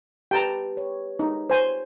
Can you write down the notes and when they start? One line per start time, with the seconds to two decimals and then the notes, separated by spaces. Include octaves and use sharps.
0.31 G4 B4 G5 A5 A#5
0.77 C#5
1.19 D#4
1.50 C5 G#5